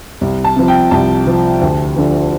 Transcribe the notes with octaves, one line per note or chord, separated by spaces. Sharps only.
C2
A5
C3 F3
G5
C2 A5
C3 F3
D2
D3 F3